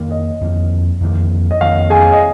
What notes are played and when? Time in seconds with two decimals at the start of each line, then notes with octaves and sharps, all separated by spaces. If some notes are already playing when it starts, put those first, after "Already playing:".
Already playing: F2 D#3 A#3
0.11 D#5
0.41 F2 D#3 A#3
1.01 F2 D#3 A#3
1.51 D#5
1.61 F2 D#3 A#3 F5
1.90 G#4 G#5
2.12 D#5